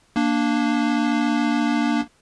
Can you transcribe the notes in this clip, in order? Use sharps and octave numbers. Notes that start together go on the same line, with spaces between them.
A#3 D4